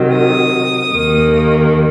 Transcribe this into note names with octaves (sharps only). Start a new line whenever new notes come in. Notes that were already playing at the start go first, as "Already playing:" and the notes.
Already playing: C3 D#3 F#3
D#6
D#2 D#3 A#3